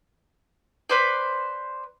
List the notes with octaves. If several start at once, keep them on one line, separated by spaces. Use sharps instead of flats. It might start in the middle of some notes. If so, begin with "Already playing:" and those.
B4 C5 D5